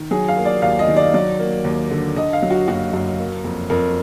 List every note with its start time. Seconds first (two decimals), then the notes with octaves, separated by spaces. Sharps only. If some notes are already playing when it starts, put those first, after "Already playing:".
Already playing: D#3
0.11 F#3 G#4
0.28 F5
0.37 A#3
0.45 D5
0.62 D#2 F5
0.79 D#5
0.88 D#3
0.96 D5
1.14 F#3 D5
1.39 A#3
1.64 D#2
1.91 D3
2.16 D3 D#5
2.33 F5
2.42 F#3
2.50 F#4
2.68 F#1 F#4
2.93 F#2
3.19 A#3
3.44 F2
3.70 F2 A#4